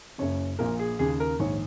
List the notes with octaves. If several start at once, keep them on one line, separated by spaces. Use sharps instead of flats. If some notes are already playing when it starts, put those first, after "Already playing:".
F#1 F#2 C#3 C#5
A#1 A#2 A#4
G#4
D#2 C#3 G#4
A#4
A#1 G#2 D#3 C#5